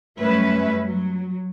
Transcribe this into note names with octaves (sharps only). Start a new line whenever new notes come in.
F#2 G3 A3 C#4 B4 E5
F#3